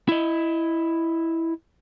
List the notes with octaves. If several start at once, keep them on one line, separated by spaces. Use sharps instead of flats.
E4 D#5